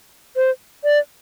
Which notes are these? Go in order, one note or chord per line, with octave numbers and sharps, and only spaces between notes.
C5
D5